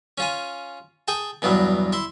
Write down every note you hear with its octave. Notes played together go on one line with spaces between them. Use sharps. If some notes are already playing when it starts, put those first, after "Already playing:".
C#4 F4 G#5
G#4 G5 A5
E2 G2 B2 F#3
E4 C6